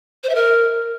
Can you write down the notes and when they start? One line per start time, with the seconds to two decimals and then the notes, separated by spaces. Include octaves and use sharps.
0.23 C5
0.29 E5
0.35 A#4